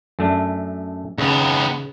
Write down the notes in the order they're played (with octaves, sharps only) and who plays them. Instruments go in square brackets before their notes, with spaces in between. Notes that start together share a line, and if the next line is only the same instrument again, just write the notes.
[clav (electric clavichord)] F#2 A3 D4
[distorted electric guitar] D#2 B3 [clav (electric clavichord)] C#3